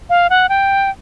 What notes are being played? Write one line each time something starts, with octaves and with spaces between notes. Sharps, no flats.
F5
F#5
G5